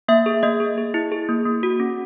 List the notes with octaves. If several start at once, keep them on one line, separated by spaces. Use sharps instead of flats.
A#3 E5
G#4
A#3 D#5
G#4
G#4
E4
G#4
A#3
A#3
F#4
C#4